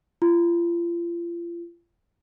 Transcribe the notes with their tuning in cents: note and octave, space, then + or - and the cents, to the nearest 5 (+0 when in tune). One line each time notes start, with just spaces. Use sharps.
F4 -35